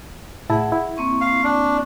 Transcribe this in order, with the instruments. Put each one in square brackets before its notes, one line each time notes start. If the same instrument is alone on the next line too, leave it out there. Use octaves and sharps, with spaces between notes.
[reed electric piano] A2 E4 A5 [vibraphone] G#4 F#5
[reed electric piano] E4
[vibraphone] A#3 C4 C#6
[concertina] F5
D4